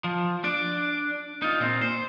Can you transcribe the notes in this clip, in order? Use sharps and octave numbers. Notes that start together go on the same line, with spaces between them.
F3
D4 D5
D#4 F4
A#2 C4
C5